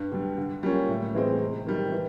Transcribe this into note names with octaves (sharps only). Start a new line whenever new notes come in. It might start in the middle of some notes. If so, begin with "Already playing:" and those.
Already playing: G2
D3 G3
D3
G3 A#3 C#4 F4
A2
E3 G#3 C4
C3
D#3 G3
E3